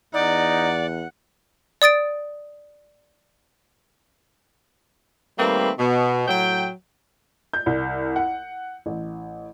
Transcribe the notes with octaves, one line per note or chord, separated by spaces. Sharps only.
E2 D#4 D5 F#5
D5 D#6 A6 D7
D#3 G3 A3 A#3 C4 B4
B2
A2 F#3 G5
G6
C2
F#5
A1